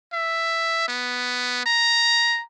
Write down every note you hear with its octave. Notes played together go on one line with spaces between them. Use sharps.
E5
B3
A#5